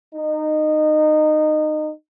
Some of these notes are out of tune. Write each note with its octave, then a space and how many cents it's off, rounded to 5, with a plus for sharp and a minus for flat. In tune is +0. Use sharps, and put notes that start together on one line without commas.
D#4 -20